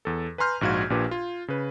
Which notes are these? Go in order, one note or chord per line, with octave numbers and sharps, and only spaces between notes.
E2 A4
B4 G#5 A#5 C6 F6 G6
A#1 G#2 F#4 F5 G#6
A#1 A#2 D4 G4 B4
F4
C#3 B4